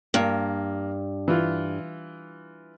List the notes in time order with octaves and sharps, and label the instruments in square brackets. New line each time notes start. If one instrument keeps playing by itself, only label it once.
[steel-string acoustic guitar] G2 [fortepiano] A#3
[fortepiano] E3 F4